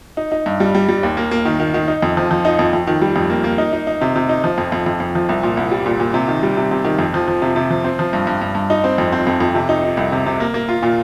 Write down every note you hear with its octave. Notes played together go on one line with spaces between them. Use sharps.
D#4
D#4
G2
G3
G3
G3
D#2
A#3
A#3
D#3
D#3
D#3
D#4
F2
F3
F3
D#4
F2
F2
D#3
G3
F2
A#3
A#3
D#4
D#4
D#4
C3
C3
D#4
F3
F2
F2
F2
F2
F3
C2
A#2
C2
G3
A#2
A#2
C3
D#3
G3
C3
C3
D#3
F2
F3
F3
C3
C3
F3
C4
F3
G2
G2
G2
G2
D#4
C4
F2
C4
F2
F2
C3
D#4
D#4
C2
C3
C3
A#3
A#3
F4
A#2